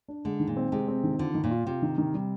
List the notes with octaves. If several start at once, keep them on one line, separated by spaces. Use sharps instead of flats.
D4
D3 G#3
D#3
A#2
C4
C3 G#3
C4
D#3
D3 F4
D#3
A#2
F4
C3 F4
D#3
D#3
G3